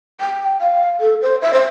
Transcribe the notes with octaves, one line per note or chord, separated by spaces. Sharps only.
G5
F5
A4
C5
E5
C5